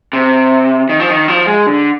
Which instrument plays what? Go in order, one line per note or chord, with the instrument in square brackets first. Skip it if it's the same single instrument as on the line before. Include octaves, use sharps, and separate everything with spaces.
[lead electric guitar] C3
D#3
F3
D#3
F3
G#3
D3